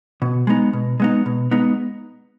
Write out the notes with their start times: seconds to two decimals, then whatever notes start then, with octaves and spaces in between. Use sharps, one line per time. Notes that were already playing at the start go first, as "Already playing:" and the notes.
0.22 B2
0.47 G#3 B3 D#4
0.73 B2
1.00 G#3 B3 D#4
1.26 B2
1.51 G#3 B3 D#4